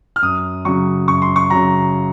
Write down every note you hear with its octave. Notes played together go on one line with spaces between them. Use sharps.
F6
F#2 D#6
C#3 F#3 C#6
F#2 C#6
C6
C#6
C#3 F#3 A#5